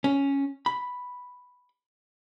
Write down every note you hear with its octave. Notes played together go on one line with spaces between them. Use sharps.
C#4
B5